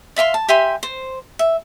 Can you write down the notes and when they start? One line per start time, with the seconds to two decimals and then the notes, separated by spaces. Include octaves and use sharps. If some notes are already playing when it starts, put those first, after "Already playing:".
0.16 D5 E5 F5 C6
0.34 A5
0.48 G4 E5 G#5 C6
0.83 C5
1.39 E5